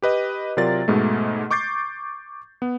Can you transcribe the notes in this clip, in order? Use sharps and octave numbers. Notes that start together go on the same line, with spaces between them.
G4 B4 D#5
C3 F#3 F4 A#4 D5 A6
G#2 B2 G#3 A3
C#6 D6 G6 A6 C7
B3